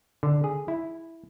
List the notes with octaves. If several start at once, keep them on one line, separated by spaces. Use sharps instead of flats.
D3
G#4
E4